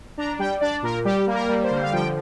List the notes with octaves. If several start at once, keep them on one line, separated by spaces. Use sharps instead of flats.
D4 A#5
G3 G5
D4 D5
A#2 A#4
G3 G4
A#3
A#4
G3
C5
D3
F5
F3 G5